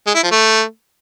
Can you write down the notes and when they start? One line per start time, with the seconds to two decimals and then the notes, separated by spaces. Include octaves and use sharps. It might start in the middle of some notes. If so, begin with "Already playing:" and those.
0.06 G#3
0.15 E4
0.23 F3
0.31 A3